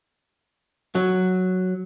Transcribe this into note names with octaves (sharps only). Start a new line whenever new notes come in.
F#3